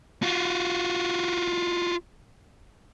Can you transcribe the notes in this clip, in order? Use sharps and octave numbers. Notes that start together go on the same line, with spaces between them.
F4 F#4